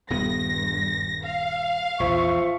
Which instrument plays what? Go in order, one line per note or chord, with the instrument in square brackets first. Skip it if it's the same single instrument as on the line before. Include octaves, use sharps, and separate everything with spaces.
[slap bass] D#1 D#3 B3 [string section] G2 A#6
[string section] F5
[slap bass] A#1 E2 [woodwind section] F3 E5 C#6